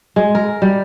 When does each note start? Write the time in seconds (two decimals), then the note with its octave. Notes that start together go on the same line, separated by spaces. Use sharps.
0.16 G#3
0.35 A#4
0.62 G3